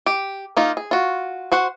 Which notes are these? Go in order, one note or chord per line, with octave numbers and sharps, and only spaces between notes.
G4
A#3 D#4 F4
G#4
F4 F#4
F#4 C5 F#5